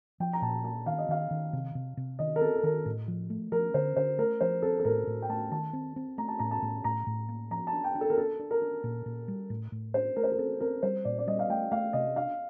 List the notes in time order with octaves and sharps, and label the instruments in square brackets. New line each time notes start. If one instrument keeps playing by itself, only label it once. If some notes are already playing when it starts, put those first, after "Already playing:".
[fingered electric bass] F3 [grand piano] G5
[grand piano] A#5
[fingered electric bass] A#2 [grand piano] A5
[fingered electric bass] A#3 [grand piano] A5
[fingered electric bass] D#3 [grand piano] F5
[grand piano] D#5
[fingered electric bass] D#3 [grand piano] F5
[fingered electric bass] D#3
C3
C3
C3
[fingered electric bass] D#3 [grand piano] D#5
[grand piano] A#4
[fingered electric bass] C4 [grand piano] A4
[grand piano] A4
[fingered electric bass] D#3 [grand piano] A#4
[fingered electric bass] A2
F3
A3
[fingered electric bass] F3 [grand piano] A#4
[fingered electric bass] D3 [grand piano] C5
[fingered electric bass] D3 [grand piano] C5
[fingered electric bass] A3 [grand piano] A#4
[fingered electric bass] F3 [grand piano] C5
[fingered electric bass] C4 [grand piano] A4
[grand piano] A4
[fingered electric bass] A2 [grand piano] A#4
[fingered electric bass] A2
[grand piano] G5
[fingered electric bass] A3 [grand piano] A5
[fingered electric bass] D#3 [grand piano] A5
[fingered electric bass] C4
C4
[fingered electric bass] A3 [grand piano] A#5
[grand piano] A5
[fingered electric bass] A2 [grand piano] A#5
[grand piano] A5
[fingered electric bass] A2
[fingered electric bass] A2 [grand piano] A#5
[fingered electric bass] A2
A#3
[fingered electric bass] F3 [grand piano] A#5
[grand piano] A5
[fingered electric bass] D4
[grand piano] G5
[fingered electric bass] D4
[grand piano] A4
A#4
[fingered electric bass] D4 [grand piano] A4
[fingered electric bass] D4
[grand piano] A#4
[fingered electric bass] D4
A#2
A#2
G3
A2
A2
[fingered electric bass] D4 [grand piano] C5
[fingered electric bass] A3 [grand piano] A#4
[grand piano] C5
A#4
[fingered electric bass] C4 [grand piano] A4
[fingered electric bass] C4 [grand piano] A#4
[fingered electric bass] G3 [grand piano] C5
[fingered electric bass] A#2 [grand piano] D5
[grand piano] D5
[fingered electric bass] G3 [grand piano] D#5
[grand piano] F5
[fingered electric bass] A3 [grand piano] G5
[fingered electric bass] A3 [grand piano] F5
[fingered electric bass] C3 [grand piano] D#5
[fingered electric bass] D4 [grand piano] F5